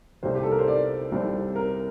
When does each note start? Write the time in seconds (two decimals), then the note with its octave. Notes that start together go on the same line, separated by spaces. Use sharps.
0.23 C2 C3 G3 C4 C5
0.35 G4
0.43 A4
0.51 A#4
0.59 C5
0.68 D5
1.12 C2 C3 G3 C4
1.56 A#4